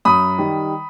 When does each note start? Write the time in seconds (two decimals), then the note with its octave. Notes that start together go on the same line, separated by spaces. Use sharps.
0.05 F#2 B5 D#6
0.38 D#3 G3